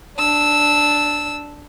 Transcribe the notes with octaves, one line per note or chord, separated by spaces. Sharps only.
D4 E6